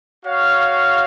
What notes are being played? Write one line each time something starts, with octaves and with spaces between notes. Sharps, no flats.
F#4 C#5 F5